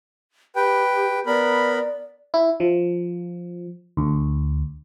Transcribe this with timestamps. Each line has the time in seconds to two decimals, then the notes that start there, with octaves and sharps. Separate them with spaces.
0.56 G4 B4 G5
1.26 B3 A#4 D5 B5
2.34 E4
2.60 F3
3.97 D2